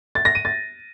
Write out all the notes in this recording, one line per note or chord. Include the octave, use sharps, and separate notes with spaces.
A6
A#6
D#7
A6